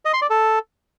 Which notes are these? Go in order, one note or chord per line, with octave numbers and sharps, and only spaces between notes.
D#5
C6
D5
A4